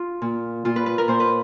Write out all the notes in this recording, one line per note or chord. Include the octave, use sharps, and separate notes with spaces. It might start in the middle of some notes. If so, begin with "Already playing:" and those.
Already playing: F4
A#2
A#2 F4
B4
B4
A#4
A#2 C5
B4